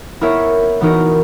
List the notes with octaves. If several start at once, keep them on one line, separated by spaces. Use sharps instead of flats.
B3 E4 A#4 C#5 E5
E3 B3 D#4 F#4 A#4